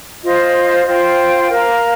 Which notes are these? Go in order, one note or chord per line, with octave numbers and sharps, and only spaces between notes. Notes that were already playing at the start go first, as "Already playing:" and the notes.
F4 C5 D#5
F4 C5 G5
A#4 F5 A#5